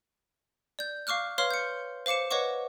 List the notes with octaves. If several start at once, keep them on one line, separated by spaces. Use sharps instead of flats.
D5 G6
F5 C#6 D6 F6 F#6
B4 C#5 F5 C6 F6
G6 C#7
C5 F5 D6 C#7 E7
B4 C#5 D#5 F#5 C#6 D6